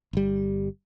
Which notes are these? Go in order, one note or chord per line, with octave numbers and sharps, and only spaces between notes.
G1 G3